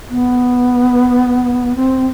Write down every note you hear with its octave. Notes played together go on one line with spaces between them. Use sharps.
B3
C4